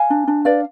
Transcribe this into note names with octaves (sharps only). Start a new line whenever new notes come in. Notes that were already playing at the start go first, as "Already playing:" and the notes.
Already playing: F5 G#5
D4
D4
B4 D5 F5